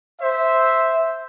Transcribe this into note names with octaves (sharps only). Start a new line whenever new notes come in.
C5 E5